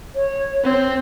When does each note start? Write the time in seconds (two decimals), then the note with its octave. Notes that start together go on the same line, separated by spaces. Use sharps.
0.15 C#5
0.64 C4